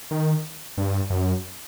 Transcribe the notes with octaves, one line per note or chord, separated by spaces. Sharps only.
D#3
G2
F#2